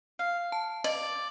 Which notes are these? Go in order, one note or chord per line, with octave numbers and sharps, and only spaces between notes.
F5
A5
D5 D#5 F#7